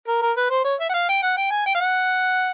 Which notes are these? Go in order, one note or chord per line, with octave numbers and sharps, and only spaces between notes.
A#4
A#4
B4
C5
C#5
E5
F#5
F5
G5
F#5
G5
G#5
G5
F5
F#5